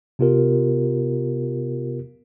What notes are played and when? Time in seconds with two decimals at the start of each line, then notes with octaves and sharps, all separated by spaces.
0.19 C3 B3 F4 G4 A#4